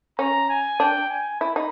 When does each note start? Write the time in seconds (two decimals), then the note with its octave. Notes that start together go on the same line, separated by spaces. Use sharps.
0.19 C#4 A#5
0.49 G#5
0.80 D4 G5
1.10 G#5
1.41 E4 B5
1.56 D#4